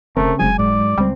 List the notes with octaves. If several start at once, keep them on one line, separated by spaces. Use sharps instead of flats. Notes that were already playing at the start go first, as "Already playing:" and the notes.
F1 C#3 A3 C4 A#4 C5
F1 F#3 G#3 G#5
G#2 D5
C#2 G3 C4